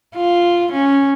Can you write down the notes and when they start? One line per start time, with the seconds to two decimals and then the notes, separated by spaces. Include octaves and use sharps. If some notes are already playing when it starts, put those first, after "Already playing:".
0.16 F4
0.72 C#4